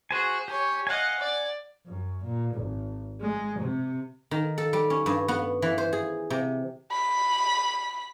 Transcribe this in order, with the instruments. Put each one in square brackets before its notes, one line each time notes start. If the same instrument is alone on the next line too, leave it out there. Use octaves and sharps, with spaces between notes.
[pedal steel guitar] F#4 C5 G#5 [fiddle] G#4
[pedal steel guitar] G4 [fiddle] C#5 G#5
[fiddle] D#5 F5 [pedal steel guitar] F#5 G#5
[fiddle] D5
[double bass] F#2
A#2
G#1
G#3
C3
[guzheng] D#3
A4
G3
C#4
G2
B3
E3
C5
G#4
C3
[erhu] B5